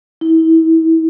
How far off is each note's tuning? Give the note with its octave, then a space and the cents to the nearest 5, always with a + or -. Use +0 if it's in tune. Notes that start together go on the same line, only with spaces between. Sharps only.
E4 -30